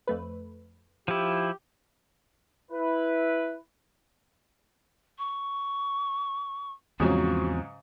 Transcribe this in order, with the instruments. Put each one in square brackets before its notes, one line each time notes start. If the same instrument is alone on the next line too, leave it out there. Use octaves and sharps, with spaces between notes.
[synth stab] F2 A3 B4
[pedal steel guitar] F3 E4 [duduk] G4
[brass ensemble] E4 B4
[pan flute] C#6
[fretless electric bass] E2 F3 C4 [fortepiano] G#2 C#3 F#3 [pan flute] F#4